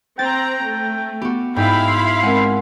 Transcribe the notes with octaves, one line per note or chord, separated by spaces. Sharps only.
C4 G5 A#5 A6
A3
B3 F#4 G4
G#2 E4 F5 G5 B5
C6 C7
G#3 C4 A#4 F#5